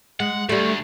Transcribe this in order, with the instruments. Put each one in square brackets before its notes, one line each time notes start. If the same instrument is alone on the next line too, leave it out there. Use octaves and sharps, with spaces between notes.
[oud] G#3 [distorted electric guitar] F#5
[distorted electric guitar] D2 [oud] G3 A3